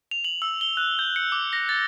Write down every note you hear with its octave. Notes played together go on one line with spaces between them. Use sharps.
F7
F#7
E6
G7
F#6
G6
C#7
D6
A#6
A6